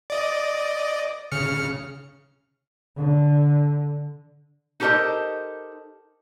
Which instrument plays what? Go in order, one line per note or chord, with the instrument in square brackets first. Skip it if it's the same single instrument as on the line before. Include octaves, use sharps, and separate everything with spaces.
[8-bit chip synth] D5 D#5
C#3 F6 C#7
[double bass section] D3
[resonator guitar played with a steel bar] D#4 G4 A4 A#4 C5 D#5